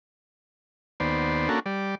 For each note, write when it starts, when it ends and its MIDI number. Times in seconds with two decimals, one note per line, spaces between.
1.00 1.49 39
1.00 1.49 59
1.00 1.49 72
1.00 1.49 74
1.49 1.60 58
1.49 1.60 61
1.49 1.60 62
1.49 1.60 66
1.49 1.60 69
1.66 1.95 55
1.66 1.95 74